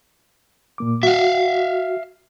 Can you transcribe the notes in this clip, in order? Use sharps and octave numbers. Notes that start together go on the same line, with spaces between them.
A#2 A#3 D6
F#4 E5 F5